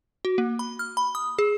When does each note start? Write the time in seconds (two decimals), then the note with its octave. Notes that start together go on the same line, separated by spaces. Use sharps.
0.25 F#4
0.38 A#3
0.59 B5
0.79 F6
0.97 B5
1.15 D#6
1.39 G#4